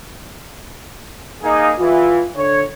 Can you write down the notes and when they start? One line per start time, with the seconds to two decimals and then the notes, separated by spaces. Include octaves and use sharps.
1.42 A#3 D#4 G#4
1.79 E2 E3 F4
2.36 D3 C#5